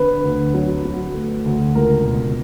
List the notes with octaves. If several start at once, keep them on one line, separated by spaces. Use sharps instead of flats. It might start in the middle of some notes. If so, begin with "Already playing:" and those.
Already playing: D3 B4
D2
F#3
F#3
A3
D2
C#2 A#4
B2